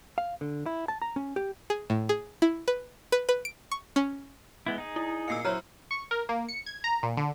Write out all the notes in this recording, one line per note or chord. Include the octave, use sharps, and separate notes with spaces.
F5
D3
E4
A5
A#5
C#4
G4
G#4
A2
G#4
E4
B4
B4
B4
D7
C#6
C#4
G#3 B3 E4
D#4 G#4
E4
A#2 D#5 F5 E6 C7 C#7
F#3 E4 C5 C#5 A#5 F6
C#6
A#4
A#3
C#7
G#6
A#5
A#2
D3